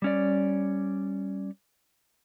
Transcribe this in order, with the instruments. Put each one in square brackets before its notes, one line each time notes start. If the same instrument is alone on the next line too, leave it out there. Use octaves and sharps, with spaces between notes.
[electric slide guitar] G3 C#4 D5